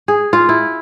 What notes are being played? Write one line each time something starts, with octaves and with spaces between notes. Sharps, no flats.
G#4
F4
E4